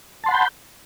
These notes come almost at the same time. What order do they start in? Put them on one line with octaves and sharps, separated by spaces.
A5 C6 F#5 B5 G6